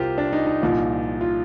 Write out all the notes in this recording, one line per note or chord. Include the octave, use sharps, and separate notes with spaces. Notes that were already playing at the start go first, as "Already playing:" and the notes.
Already playing: C2 C3 F4 G4 A#4 C5
D4
D#4
D#4
C2 A#2 F3
F4